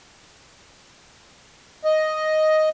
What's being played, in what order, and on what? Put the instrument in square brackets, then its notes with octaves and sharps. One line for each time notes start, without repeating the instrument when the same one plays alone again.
[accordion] D#5